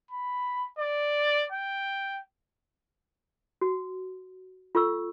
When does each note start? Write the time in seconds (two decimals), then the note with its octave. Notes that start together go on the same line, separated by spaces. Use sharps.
0.11 B5
0.79 D5
1.52 G5
3.61 F#4
4.75 F4 A4 C#6 E6